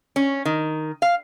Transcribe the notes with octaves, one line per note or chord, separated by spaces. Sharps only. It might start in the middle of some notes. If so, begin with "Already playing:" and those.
C#4
D#3
F5